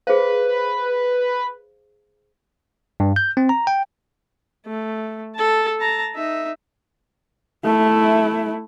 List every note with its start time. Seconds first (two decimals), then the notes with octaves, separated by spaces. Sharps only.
0.07 G#4 B4 C5 F5
3.00 G2
3.16 G6
3.37 C4
3.49 A#5
3.67 G5
4.66 A3
5.36 A4 A5
5.79 A5 A#5
6.15 D#4 E5
7.64 A3 E4